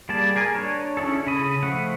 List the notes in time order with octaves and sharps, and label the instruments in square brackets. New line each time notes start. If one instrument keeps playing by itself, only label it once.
[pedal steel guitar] G3 A#3 G#4 D5 A5
G#4 A#4 G#5
D4 C#5
C#4 E4 G#4 A4
C#3 B5 D#6
F3 A3 F#5